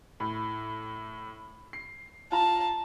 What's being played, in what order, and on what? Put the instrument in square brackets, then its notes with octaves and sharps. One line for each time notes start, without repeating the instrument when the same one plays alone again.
[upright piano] A2
C7
[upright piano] F4 A#5 [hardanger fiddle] A5